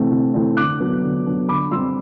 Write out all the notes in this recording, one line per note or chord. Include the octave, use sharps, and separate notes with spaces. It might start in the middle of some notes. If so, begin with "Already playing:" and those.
Already playing: C3 E3 A3 C4
C3
E3 A3 C4
D3 D6 F#6
F#3 B3 D4
D3
F#3 B3 D4
D3 B5 D6
G3 C4 C6 E6